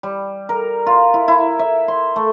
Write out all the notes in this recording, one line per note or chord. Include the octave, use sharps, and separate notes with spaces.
G3
A#4
F4
E4
E4
E5
C6
A3